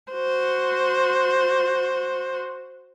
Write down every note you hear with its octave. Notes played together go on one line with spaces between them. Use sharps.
F#4 C5